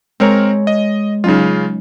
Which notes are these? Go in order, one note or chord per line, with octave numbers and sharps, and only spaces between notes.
G#3 C4 A#4 C#5 A#5
D#5
C#3 F#3 C#4 D#4 F4